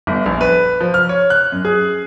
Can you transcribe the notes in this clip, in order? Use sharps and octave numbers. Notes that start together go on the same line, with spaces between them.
G1
A#1
B4
F3
F6
C#5
F#6
F#2
G#4